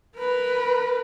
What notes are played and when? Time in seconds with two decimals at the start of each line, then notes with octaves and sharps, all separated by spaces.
0.17 A#4 B4